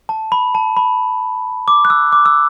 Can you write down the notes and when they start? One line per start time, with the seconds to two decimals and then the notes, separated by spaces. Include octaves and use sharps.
0.09 A5
0.32 B5
0.55 A5
0.77 B5
1.68 D6
1.85 F#6
1.90 E6
2.12 D6
2.26 E6